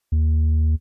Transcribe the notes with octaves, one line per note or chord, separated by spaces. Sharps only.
D#2